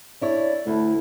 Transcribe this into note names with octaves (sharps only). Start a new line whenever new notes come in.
D4 E4 C#5 D5
D2 A3 E4